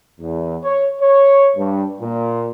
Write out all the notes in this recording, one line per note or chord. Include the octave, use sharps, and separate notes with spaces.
E2
C#5
C#5
G2
A#2